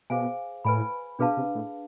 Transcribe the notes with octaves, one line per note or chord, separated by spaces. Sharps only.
B2 G#4 C5 F5 G#5
A2 B4 D5 G#5 B5
B2 D4 G#4 B4 F5 A5
C3
A2